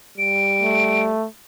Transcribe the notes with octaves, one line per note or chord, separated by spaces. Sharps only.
G3 D7
A3